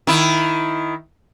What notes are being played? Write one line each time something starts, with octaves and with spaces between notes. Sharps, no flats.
D#3 E4